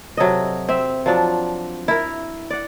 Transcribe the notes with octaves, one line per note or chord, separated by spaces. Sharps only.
C3 F#3 A4 D#5
C4 E5
F3 F#3 D4
E4 A#4
D5 F#5